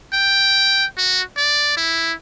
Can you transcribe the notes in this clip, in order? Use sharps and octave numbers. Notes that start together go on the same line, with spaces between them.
G5
F#4
D5
E4